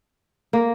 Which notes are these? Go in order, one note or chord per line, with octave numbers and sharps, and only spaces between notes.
A#3